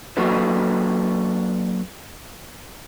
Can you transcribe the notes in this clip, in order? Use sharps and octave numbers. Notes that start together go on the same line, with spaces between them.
F#3 A#3 D4 F#4 A4 B4